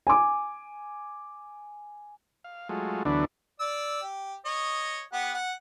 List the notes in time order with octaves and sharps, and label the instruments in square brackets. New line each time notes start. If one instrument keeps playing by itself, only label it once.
[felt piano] G#5 D6
[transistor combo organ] F5
F#3 G#3 A3 F4
D2 D3 E3 F#3 B3 D4
[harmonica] D5 E6
G4
C#5 D#5
B3 G4 F#5
F#5